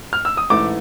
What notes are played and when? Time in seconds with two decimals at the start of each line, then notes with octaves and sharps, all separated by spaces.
0.13 F6
0.25 E6
0.37 D#6
0.50 A1 G#2 E3 A3 D6